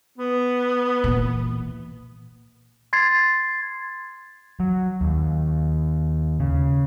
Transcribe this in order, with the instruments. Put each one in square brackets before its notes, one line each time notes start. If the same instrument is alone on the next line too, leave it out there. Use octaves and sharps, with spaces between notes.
[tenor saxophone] B3
[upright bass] A#2 E3
[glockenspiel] C6 G#6 A6 C7
[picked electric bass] F#3
D#2
C#3